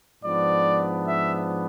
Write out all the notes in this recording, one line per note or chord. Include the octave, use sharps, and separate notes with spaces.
G#2 F3 B3 D4 D5
E5